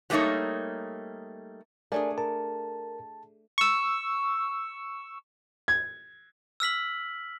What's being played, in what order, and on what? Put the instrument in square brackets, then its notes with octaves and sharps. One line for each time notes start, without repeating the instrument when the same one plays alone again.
[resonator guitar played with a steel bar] F#3 G3 A3 A#3 D#4 C#5
[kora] A3 D4 G#4 [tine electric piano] A#4 D5 G#5
[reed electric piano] A#4 [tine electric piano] A5
[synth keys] C#6 E6
[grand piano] G#6
[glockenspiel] E6 F6 B6 F#7